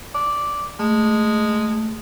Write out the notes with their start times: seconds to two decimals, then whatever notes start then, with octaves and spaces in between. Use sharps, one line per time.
0.15 D5
0.79 G#3 A3